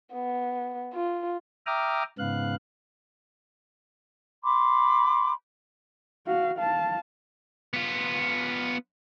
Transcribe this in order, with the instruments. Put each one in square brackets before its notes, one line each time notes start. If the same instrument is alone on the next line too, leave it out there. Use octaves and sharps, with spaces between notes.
[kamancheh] B3
F4
[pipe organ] E5 G5 A#5 D6 D#6 F6
G#2 C#3 B3 F5 F#6
[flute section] B5 C6 D6
[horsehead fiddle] F#4 F5
F5 A5
[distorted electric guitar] B3 F4